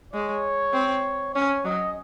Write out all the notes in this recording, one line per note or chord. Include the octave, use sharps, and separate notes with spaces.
G#3 C#5
C4
C#4 C#5
F#3 D#5